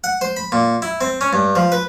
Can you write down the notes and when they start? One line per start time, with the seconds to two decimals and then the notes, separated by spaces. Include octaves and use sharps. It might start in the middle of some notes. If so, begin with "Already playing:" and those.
0.04 F#5
0.21 C5
0.36 B5
0.52 A#2
0.82 E4
1.01 C4
1.21 C#4
1.33 G2
1.56 F3
1.72 B4